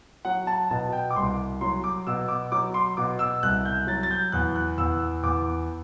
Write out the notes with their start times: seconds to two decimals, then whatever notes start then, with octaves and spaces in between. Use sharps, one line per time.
0.25 F#3 F#5
0.47 A5
0.71 B2 A5
0.93 G5
1.11 D6
1.16 C2 C6
1.61 F#3 C6
1.84 D6
2.07 B2 E6
2.28 D6
2.52 F#3 D6
2.74 C6
2.97 B2 D6
3.19 E6
3.43 C2 F#6
3.65 G6
3.87 F#3 A6
4.03 A6
4.11 G6
4.32 E2 F#6
4.55 F#6
4.78 E2 E6
5.23 E2 D6